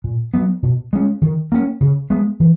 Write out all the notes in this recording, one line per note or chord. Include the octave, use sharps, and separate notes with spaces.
A#2
F#3 B3
B2
G#3 C#4
D#3
A#3 C#4
C#3
G#3 B3
E3